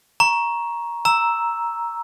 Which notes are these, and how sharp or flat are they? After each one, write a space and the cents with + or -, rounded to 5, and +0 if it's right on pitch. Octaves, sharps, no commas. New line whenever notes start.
A#5 +10 C#6 +0
A#5 +0 E6 +0